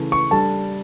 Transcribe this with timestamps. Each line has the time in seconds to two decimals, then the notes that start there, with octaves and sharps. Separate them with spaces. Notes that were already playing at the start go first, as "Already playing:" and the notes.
Already playing: C#3 E3 A3
0.12 C#6
0.31 G3 D4 A4 A5